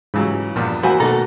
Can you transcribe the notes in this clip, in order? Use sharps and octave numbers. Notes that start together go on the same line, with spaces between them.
G#2 C#3 E3 F#3
E2 G2 A#2 F3
E3 A#3 F#4 C5 G#5 B5
B2 D#3 A3 A#3 A4 A#5